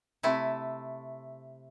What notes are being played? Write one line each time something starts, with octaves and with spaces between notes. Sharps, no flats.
C3 A3 E4